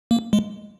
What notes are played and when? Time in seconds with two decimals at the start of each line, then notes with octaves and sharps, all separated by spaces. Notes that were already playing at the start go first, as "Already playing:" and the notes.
0.11 A#3
0.33 G#3